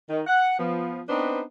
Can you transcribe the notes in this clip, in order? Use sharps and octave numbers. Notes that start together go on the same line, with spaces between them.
D#3
F#5
F3 B3
B3 C4 D4 D#4 B4 C5